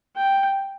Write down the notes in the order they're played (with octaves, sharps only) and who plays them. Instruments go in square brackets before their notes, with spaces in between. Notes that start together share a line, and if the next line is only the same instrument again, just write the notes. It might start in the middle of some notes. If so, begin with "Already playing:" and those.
[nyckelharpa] G5